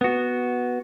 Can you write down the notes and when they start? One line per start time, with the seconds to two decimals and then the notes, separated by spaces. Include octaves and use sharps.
0.01 B3 F#4